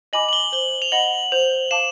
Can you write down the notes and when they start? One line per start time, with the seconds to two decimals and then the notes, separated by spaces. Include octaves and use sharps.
0.13 D#5 G#5 B5 D6 F#7
0.29 F#7
0.33 G7
0.52 C5 G7
0.82 F7
0.92 D#5 F#5 B5 F#7
1.32 C5 F7
1.71 F5 A5 D6 E7